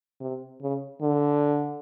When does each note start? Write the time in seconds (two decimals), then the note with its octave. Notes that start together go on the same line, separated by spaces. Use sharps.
0.21 C3
0.62 C#3
1.02 D3